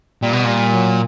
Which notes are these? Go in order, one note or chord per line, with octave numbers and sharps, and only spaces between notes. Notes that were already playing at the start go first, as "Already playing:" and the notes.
A#2 G3
B2
A#2 G3
F#3